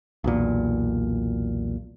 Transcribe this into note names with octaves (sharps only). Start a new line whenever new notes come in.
B1 E2 A#2